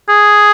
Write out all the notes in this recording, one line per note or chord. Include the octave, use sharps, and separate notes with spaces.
G#4